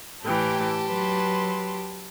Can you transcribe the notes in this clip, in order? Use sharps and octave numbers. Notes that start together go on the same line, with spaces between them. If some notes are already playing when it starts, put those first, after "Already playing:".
A2 E3 G4 G5 A5
F#3 B4 C6